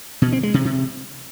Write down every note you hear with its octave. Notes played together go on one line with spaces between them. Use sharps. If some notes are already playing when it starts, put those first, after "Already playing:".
B2
C4
G#3
C3
C3